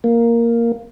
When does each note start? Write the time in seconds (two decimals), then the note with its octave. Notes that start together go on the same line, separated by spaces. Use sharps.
0.04 A#3